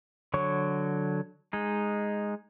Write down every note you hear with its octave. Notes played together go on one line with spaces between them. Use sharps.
D3 F#3 C#5 C#6
G#3 D#4